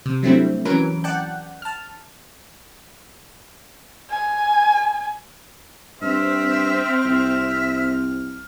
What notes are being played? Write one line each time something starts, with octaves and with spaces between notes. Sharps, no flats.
C3
F#3 G3 A3 C4 D4 E4
E3 F#3 C#4 A#4 B4 D7
D5 F#5 G5 A5 F#6
A5 F6
G#5
G2 C4 E5 F6
C2 E5